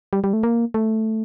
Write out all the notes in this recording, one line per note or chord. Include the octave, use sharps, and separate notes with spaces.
G3
G3
A3
A#3
A3